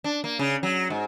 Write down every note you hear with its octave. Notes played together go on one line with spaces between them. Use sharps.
D4
A#3
C#3
F#3
G#2